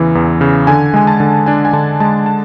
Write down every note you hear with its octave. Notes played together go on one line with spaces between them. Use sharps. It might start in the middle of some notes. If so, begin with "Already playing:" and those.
Already playing: E2 C#3 E3
E2
C#3
D3 G#5
G#3 G#5
A5
D3
D4 G#5
G#5
D3 A5
G#3 A5
A5